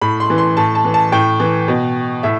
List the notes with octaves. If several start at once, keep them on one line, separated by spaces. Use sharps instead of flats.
A2 B5
C6
E3
C6
A2 A5
A5
E3
A5
A2 G5
E3
B2
A2 E5